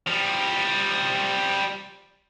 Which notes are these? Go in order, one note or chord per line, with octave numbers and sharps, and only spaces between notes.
F3 G3